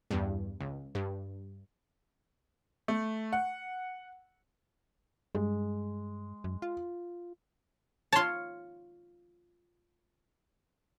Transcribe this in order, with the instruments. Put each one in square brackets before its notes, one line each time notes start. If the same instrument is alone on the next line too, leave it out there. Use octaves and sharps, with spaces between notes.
[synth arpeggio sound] E2 G2
C#2
G2
[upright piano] A3
F#5
[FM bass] G2 [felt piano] G#3
[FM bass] F#2
F4
[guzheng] F4 C#5 [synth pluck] A5 C6